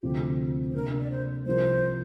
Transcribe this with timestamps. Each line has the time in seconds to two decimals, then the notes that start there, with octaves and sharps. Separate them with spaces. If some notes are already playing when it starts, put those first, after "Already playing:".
0.03 D2 C3 F3 C4 F4 G4
0.70 C5
0.74 C3 A#3 D4 A#4
0.99 D5
1.10 C5
1.46 C2 C3 F3 C4 A#4 C5